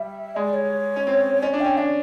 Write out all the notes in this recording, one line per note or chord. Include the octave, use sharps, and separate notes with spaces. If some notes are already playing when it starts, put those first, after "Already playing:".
Already playing: G3 E5
G#3 D5
C#5
C#4
C4
C#4 D5
D4
C#4 G5
D4 D5